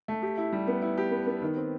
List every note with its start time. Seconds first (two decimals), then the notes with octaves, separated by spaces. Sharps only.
0.08 A3
0.22 G4
0.37 E4
0.53 G3
0.67 B3
0.82 E4
0.98 G4
1.11 B3
1.27 B3
1.42 D#3
1.56 C4